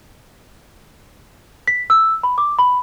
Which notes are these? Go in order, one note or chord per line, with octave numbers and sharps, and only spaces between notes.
B6
E6
B5
D6
B5